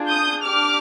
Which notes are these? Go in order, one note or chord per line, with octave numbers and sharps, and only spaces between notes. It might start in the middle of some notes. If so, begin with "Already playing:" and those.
Already playing: D4 F4 G#4
D#6 G6
D4 G4 D6 F6